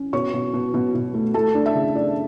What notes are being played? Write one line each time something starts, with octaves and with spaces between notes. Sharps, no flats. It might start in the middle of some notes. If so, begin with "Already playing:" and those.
Already playing: C#4
B2 C#5 C#6
B2
B2
B2
B2
A3
A3 A4 A5
D4
E5
C#3
D4 D5